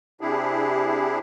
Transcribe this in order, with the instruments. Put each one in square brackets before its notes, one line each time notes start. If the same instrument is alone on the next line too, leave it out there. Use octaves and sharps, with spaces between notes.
[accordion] C3 D4 E4 G4 G#4